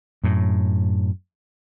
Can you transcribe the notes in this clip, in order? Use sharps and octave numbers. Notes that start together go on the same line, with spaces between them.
F#2 A2